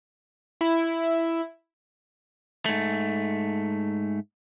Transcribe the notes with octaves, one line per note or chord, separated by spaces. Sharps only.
E4
G#2 A3